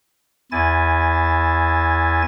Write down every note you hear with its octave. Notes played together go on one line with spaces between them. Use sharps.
E2 E4 G#5 A6